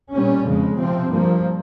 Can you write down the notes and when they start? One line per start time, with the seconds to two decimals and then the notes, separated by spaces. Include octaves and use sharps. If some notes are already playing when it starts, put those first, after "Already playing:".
0.13 A#2 G3 C#4
0.46 F2 C#3 G#3
0.78 C3 F3 C4
1.10 G2 F3 A#3